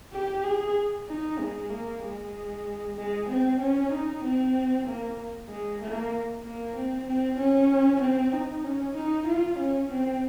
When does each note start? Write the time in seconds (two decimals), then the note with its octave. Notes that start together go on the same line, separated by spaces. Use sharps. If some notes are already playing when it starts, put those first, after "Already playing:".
0.12 G4
0.44 G#4
1.08 D#4
1.39 G#3
1.70 A#3
2.02 G#3
2.96 G#3
3.29 C4
3.60 C#4
3.91 D#4
4.23 C4
4.86 A#3
5.49 G#3
5.81 A#3
6.43 A#3
6.75 C4
7.07 C4
7.38 C#4
8.01 C4
8.32 D#4
8.64 C#4
8.95 D#4
9.27 F4
9.58 C#4
9.91 C4